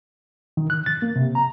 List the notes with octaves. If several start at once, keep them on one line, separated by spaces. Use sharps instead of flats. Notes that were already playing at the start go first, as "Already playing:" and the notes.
D#3
F#6
A6
A#3
C3
A#5